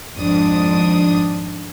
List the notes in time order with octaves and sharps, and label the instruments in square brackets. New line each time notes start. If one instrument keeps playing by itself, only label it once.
[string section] G#1 F2 G#2 D4 D#6